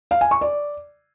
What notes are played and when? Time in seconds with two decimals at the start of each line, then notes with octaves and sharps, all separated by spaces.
0.11 F5
0.21 G#5
0.31 C#6
0.41 D5